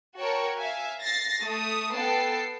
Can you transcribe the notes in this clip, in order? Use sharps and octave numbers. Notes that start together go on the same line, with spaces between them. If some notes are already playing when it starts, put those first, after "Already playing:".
F#4 A#4 C#5 G5 A5 C#6
E5 F5 G#5
A6 A#6 C7
A3 D#6
B3 A4 G5 A5 C7